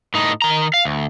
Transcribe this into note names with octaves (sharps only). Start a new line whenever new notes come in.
A2 D#4
D#3 A#5
F5
D2